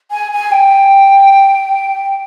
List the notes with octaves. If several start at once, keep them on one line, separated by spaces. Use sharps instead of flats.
G#5
G#5
G5